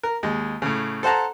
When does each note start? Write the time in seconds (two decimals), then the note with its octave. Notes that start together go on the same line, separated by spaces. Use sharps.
0.03 A#4
0.23 D#2 G#3
0.62 A2 C#3
1.03 A4 C5 F#5 A5 A#5